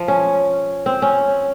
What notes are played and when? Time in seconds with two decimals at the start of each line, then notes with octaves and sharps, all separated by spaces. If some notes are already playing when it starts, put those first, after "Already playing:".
Already playing: F3
0.08 C#4
0.86 C4
1.02 C#4